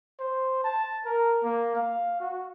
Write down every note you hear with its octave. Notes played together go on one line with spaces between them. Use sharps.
C5
A5
A#4
A#3
F5
F#4